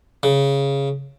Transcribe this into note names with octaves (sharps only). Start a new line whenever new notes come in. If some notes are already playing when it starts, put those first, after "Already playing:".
C#3